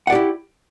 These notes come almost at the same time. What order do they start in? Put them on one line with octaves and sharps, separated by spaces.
F#5 D5 G4 E4